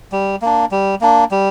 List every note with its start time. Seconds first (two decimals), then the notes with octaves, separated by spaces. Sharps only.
0.12 G3
0.42 A#3 D4
0.71 G3
1.01 A#3 D4
1.31 G3